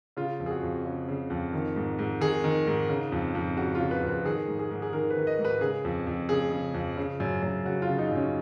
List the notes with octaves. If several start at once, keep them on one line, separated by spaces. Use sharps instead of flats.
C#3 F4
F2
G#4
F#4
F2
C#3
C#3
F2
D#3
G#2
G#2
D#3 G#4
D#3
G#2
C#3
F2
F2
C#3 F#4
F4
C#3
B4
F2
B4
D#3 G#4
G#2
G#4
G#2
G#4
D#3 A#4
B4
D#3
D#5
G#2
B4
C#3 G#4
F2
F2
C#3 G#4
C#3
F2
C#3
F#2
F#2
C#3 F#4
F4
C#3
D#4
F#2 C#4